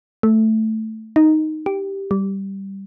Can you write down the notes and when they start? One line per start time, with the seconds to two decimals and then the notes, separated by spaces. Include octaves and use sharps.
0.23 A3
1.16 D#4
1.66 G4
2.11 G3